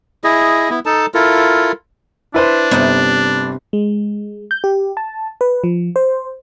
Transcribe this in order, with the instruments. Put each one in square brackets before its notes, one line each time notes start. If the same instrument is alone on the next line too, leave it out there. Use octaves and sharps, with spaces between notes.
[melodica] E4 G#4 D#5
B3 E4
D#4 A4 A5
E4 F4 A4 A#4
[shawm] D4 [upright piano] E4 B4 C5
[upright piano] G1 [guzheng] C3 D#4 B4
[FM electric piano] G#3
G6
G4
A5
B4
F3
C5